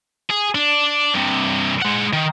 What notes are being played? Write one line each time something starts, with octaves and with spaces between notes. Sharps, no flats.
G#4
D4
G2 C3
G#3 F#5
D#3